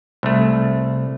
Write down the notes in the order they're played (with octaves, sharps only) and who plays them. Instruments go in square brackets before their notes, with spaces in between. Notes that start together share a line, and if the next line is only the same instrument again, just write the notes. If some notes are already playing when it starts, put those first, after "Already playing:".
[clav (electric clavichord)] C2 A3